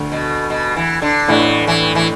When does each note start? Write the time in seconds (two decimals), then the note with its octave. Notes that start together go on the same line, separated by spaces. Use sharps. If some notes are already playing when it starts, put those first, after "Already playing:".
Already playing: D2 D3 A3
0.12 B2
0.50 B2
0.76 E3
1.02 D3
1.28 A1 A2 E3 A3 D4
1.67 E3
1.95 E3